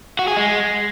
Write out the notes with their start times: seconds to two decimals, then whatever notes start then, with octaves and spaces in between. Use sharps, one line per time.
0.19 F#4
0.28 G#4
0.36 G#3